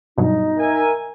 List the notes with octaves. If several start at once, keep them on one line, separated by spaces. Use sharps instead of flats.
G2 B2 F#3 D#4
A#4 E5 G#5